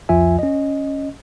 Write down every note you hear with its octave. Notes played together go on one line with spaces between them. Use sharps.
C2 F2 F3 F4 E5 G#5
C#4 D#5